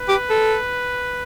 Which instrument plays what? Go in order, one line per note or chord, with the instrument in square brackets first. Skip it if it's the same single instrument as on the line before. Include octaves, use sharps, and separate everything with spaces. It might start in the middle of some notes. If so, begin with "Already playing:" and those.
Already playing: [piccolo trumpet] B4
[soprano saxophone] G4
A4